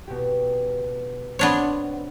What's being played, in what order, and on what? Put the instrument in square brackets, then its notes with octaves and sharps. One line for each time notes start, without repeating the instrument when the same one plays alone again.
[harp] B2 G4
[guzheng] B3 D4 C#5 [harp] C4